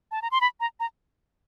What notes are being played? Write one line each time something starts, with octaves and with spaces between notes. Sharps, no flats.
A5
A#5
C6
B5
A#5
A#5